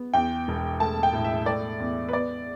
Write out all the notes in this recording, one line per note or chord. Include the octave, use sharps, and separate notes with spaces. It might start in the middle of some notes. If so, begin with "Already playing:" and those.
Already playing: B3
E2 G5
E1
A3 A5
G5
A2
E5
A3 D5
E2
B4
B3 D5